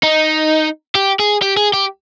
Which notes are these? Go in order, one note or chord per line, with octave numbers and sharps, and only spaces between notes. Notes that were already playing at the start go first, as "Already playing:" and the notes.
D#4
G4
G#4
G4
G#4
G4